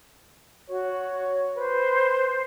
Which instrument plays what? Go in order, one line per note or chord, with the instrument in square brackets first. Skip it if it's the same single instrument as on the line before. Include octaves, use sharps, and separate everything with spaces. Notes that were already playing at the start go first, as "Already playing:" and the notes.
[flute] F#4 [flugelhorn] C#5
[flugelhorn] B4 [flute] C5